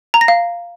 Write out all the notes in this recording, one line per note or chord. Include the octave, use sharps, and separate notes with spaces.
A#5
A#6
F5